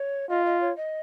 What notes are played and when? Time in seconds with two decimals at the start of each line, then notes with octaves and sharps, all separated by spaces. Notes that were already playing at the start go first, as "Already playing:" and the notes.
Already playing: C#5
0.30 F4 D#5
0.46 D#5
0.61 C#5
0.77 D#5